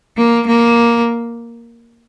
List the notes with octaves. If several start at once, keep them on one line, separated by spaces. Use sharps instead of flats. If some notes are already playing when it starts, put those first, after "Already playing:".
A#3
A#3